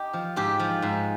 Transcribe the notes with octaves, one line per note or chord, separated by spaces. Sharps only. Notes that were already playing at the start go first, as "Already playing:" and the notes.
Already playing: D#4 G4
F3
G#2 G4
F3
G#2